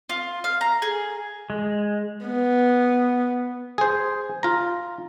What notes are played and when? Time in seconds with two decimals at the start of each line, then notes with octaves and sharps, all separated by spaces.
0.09 F4
0.44 F5
0.61 A#5
0.82 G#4
1.50 G#3
2.26 B3
3.78 G#4 C5
4.43 F4 A#5